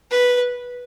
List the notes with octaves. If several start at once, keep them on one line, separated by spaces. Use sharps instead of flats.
B4